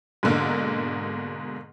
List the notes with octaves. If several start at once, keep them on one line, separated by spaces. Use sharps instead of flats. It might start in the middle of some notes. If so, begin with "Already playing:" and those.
G#2 B2 D3 A#3